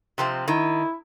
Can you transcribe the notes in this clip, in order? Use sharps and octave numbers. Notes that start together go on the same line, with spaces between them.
C3 F3 C4
D#3 E4